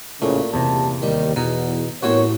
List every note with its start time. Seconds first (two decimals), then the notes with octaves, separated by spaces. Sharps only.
0.22 A1 A#2 C#3 A3
0.54 F#1 E2 C3 G4 A5
1.02 D#2 D#3 G3
1.36 E2 B2 D#4
2.03 A1 B3 C4 F#4 A#4 C#5 G5